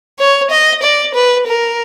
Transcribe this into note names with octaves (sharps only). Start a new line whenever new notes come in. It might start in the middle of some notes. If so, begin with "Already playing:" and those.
C#5
D#5
D5
B4
A#4